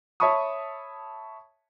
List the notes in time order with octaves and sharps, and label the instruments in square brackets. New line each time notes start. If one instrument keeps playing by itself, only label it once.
[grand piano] C#5 E5 A5 B5 C#6 D#6